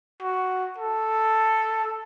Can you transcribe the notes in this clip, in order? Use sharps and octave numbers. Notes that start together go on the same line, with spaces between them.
F#4
A4